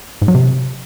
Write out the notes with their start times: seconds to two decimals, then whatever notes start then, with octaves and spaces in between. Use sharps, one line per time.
0.22 G#2
0.28 F#3
0.35 C3